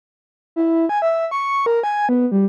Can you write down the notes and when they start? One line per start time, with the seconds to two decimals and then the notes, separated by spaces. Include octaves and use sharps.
0.56 E4
0.89 G#5
1.02 E5
1.31 C#6
1.66 A#4
1.83 G#5
2.09 B3
2.32 G3